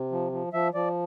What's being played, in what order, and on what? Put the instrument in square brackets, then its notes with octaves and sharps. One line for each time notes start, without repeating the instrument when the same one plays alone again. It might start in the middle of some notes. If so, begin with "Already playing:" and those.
Already playing: [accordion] C3
F3
F3
F3 E5
F3 D5